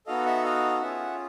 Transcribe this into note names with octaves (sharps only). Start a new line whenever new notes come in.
B3 D#4 F#4 A4 D#5 F5
E5 F#5
D#5 F5
C#4 F4 G#4 E5 F#5